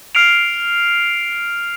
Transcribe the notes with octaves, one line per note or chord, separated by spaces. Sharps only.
F6 C7 D7 F7